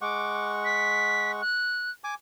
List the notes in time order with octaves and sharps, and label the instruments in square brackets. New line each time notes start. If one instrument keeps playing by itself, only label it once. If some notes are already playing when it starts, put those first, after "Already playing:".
[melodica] G#3 F#5 C#6 [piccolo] D6
[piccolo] B6
F#6
[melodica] G#5 D6